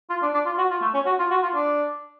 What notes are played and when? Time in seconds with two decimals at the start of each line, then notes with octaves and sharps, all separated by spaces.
0.10 F4
0.22 D4
0.34 D4
0.46 F4
0.58 F#4
0.70 F4
0.82 A3
0.94 C#4
1.06 F#4
1.19 F4
1.31 F#4
1.43 F4
1.54 D4